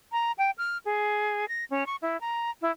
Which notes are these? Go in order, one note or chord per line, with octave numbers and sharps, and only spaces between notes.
A#5
G5
F6
G#4
A#6
C#4
C#6
E4
A#5
E4